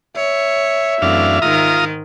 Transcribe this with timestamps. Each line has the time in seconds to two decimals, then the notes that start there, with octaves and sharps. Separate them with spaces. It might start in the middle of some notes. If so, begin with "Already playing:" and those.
0.16 C#5 E5
1.02 F#2 E3 A3 C4 D4 F5
1.42 G#2 D#3 G#3 F4 A#5 D#6